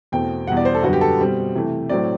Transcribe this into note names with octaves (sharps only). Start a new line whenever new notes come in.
E2 B2 A3 C4 G5
E2 B2 G3 F#5
D5
C5
A4
F#2 D3 G3 B3 F#4
G4
A4
B2 G3 C4
C3 E3 A3
A2 F#3 C4 D5